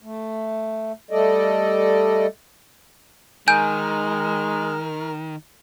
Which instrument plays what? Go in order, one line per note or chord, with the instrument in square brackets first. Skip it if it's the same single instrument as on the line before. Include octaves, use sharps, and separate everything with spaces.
[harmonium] A3
G3 A3 A4 D5 D#5
[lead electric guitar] D#3 [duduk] G#3 [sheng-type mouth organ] A#4 F6 [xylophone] G#5 G6